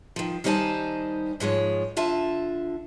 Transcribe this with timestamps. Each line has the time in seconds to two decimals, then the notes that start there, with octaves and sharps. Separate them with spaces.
0.16 D#3 F3
0.44 D#3 G3 D#4 C5 G#5 A5
1.40 G#2 F3 G#3 C#5
1.97 D3 F4 E5 A5